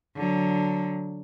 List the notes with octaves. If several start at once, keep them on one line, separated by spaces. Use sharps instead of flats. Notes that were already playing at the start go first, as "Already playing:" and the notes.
D3 F#3